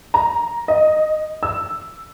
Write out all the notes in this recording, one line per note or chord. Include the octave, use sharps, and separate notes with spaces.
A#5
D#5
E6